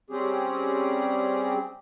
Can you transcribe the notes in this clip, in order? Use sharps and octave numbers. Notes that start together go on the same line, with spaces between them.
G3 C4 C#4 G4 G#4